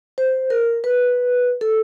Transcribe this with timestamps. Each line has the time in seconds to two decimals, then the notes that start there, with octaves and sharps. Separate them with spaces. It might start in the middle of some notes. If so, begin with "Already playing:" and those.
0.18 C5
0.50 A#4
0.84 B4
1.61 A4